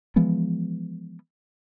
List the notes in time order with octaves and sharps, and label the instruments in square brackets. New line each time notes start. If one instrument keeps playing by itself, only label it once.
[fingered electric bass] E3 F3 G#3 B3